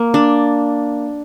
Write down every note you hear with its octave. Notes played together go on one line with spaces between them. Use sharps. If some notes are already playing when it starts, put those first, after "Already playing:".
Already playing: A#3
D4